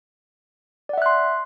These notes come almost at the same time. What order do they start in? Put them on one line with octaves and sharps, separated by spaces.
D5 F#5 E5 F#6 C6